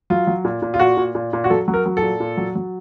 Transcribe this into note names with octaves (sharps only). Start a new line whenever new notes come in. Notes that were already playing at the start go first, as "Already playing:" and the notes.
F#3 F4
F#3
A#2
A#2
F4
A#2 F#4
A#2
A#2
A#2
F#4
F#3 A4
F#3
A#4
F#3
A4
A#2
A#2
F#3
F#3